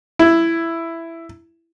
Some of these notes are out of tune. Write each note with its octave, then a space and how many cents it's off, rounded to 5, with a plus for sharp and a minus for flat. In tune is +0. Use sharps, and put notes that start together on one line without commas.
E4 +10